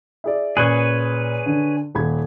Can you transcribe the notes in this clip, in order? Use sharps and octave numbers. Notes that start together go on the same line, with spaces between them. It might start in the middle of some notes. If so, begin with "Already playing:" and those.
E4 G#4 D5
A#2 C#3 G#4 B4 C#5 F#6
D3
D#1 B5 G#6